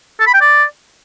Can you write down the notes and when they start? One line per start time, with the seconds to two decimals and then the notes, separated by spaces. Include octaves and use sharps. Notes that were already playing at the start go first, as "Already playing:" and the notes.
0.20 A4
0.27 B5
0.34 G5
0.41 D5